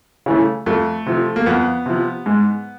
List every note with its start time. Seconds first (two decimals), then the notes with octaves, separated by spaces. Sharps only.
0.26 C#3 E3 A3
0.66 F2 A3
1.06 C3 F3
1.36 A#3
1.46 F2 B3
1.86 C3 F3
2.26 G#2